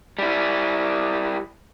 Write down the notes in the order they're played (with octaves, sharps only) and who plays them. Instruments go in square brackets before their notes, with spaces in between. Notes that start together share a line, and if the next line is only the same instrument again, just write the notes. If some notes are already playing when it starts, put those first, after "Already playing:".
[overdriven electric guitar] G3 E4